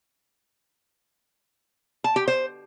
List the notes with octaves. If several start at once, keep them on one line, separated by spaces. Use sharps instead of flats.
A5
G4
C5